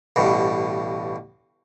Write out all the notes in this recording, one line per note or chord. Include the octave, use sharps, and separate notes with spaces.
A1 G2 B2